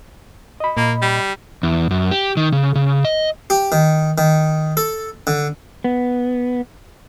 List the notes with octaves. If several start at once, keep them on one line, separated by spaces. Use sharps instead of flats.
D#5 B5
A#2 A#3
G3
E2
F#2
G4
D#3
C#3
C#3
D#5
G4
D#3
D#3
A4
D3
B3